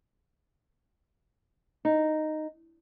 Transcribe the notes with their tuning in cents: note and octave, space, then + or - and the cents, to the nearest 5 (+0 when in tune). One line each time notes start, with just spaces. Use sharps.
D#4 -5